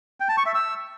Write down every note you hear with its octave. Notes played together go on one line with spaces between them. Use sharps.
G5
A5
C#6
E5
E6